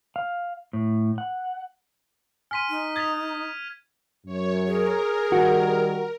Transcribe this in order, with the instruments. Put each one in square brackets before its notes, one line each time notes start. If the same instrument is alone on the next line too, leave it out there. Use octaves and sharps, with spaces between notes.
[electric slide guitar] F5
A2
F#5
[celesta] G#5 C6 [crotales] F6 B6 D#7
[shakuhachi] D#4
[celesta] D#6 A6 [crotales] G#6 B6 F7
[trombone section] F#2 [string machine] C#5
[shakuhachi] G#4 [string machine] A#4
[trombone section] D#3 G3 [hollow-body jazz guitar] F#4